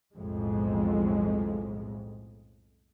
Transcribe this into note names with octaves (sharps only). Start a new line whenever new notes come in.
B1 F2 A2 G#3